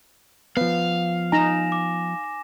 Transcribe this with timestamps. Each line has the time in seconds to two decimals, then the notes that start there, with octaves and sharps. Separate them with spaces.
0.57 F3 B3 F5
1.32 D#4 G#5 A#5 A#6 E7
1.72 D6